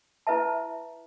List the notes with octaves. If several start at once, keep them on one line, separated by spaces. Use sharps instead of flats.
E4 B4 E5 A5